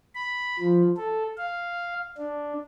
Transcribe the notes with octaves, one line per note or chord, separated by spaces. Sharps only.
B5
F3
A4
F5
D4